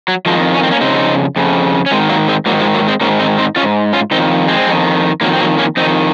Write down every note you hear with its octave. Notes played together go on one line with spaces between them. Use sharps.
F#3
F2 D#3 F3 G#3
C#4
C4
A#3 C#4
F2 C#3 C4 D#4
F2 C#3
C#4
G#2 D#3 G#3 C4
F#3 A#3
G#3 C4
G#2 D#3 F#3 A#3
F3 G#3
F#3 A#3
G#3 C4
G#2 D#3 A#3 C#4
C4 D#4
C4 D#4
D#3 C#4 F4
G#2
C#4 F4
F2 D#3 C4 D#4
G#3 C4
F2 D#3
F2 D#3 F#3 A#3
C4
F#3 A#3
A#3 C#4
F2 D#3 C4 D#4